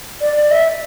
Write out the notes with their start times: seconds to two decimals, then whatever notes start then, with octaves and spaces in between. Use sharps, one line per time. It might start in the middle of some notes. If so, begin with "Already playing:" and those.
0.21 D5
0.36 D5
0.50 E5